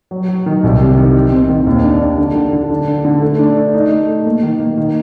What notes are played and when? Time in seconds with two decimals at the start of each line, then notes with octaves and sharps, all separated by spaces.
0.11 F#3
0.29 F#3
0.46 D#3
0.64 C2
0.81 C3
0.97 D#3
1.14 D#3
1.32 C4
1.49 D#3
1.67 D#2
1.84 D4
2.01 D4
2.18 D3
2.35 D3
2.53 D3
2.70 D4
2.88 D3
3.05 D3
3.22 A3
3.39 D4
3.57 A3
3.74 D#4
3.91 A3
4.09 A3
4.26 A#3
4.43 D#3
4.60 A#3
4.78 D#3